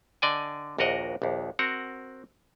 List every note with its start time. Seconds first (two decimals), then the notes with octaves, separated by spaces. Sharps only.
0.22 D3 D5 D#5 G5 G#5
0.78 A#1 D#2 F#4 A#4 D#5 F#5
1.22 A#1 D#2
1.59 C4 F#4 A#4 F#5